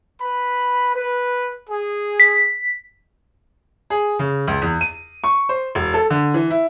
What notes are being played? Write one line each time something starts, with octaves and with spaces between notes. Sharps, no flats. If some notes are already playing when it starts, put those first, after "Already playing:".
B4 B5
B4
G#4
B6
G#4
C#3
C#2
E2
D#7
C#6
C5
E1
A4
D3
E3
E4